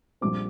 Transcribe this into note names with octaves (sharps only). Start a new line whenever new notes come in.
A#1 A#2 G3 C4 D6